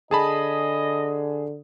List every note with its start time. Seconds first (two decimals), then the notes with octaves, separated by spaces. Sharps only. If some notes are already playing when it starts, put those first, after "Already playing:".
0.11 D3 G#4 D#5 A5 B5